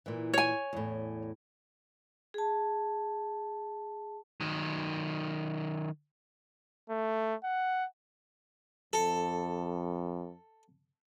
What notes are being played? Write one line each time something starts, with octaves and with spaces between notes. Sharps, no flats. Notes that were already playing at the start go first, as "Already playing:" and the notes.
A#2 E3
C#5 G#5
E2 A2
G#4 A5
D#3 F#3
A3
F#5
F2 A4